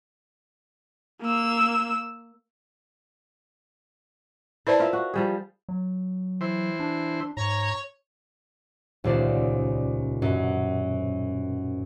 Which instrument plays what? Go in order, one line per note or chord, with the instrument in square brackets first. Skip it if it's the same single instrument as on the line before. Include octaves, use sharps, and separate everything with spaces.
[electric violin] A#3 E6
[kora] E4 C5 [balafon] B4 D5 A5
[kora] F4 A#4 E5
F#4
F3 G3 G#4
[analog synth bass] F#3
[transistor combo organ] E3 C5
[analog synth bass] D4
[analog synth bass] G#2 [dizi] C#5 [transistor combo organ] A#5
[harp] D#1 C#2 C5 D5
F#2 B2